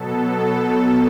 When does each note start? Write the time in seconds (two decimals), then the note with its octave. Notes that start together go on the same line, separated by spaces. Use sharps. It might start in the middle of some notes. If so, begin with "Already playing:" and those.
Already playing: B2 F#3 B3 A4
0.36 A4